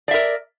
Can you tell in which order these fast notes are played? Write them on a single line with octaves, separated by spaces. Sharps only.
D5 E5 A#4